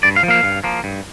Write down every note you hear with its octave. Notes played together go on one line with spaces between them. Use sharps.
G2 D5
F5
F3
A#3 F5
G2
F3 A#3
G2